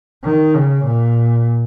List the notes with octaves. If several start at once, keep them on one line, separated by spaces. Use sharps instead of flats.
D#3
C#3
A#2